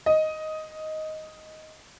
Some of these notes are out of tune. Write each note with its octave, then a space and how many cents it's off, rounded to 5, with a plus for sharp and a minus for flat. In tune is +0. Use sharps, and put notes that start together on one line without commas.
D#5 +5